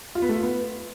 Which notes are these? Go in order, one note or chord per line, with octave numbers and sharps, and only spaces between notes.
F4
B3
A3
F4
B3